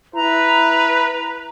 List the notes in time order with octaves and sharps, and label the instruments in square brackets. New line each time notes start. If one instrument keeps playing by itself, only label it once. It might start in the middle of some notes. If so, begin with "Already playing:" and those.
[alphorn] E4 [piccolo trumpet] B4 [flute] A#5